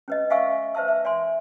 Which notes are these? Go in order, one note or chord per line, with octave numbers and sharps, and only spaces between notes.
C#4 B4 D#5
E5 F5 G#5 C#6 E6
B4 C5 E5 A5 E6
E5
D5 G#5 C6